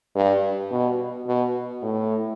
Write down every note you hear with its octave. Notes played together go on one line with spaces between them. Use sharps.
G2
B2
B2
A2